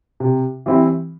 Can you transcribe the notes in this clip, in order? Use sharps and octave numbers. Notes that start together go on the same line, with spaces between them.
C3
E3 G3 C4 E4